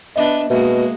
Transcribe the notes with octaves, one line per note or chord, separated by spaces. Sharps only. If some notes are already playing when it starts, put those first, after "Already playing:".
B3 D4 B4 D#5 E5 D6
B2 G#3 A#3 F#4 E5